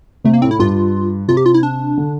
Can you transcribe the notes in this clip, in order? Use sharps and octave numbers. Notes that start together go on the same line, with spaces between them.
C3 A3
A#3
A2 C4
E4
G2 F4
C3 F4
G4
F4
E4
D4
D3